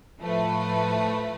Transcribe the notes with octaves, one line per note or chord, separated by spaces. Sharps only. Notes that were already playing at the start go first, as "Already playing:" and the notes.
A2 F3 A3 B4